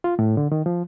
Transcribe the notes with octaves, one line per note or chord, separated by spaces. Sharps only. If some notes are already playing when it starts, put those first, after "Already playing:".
F4
A2
D3
D#3
F3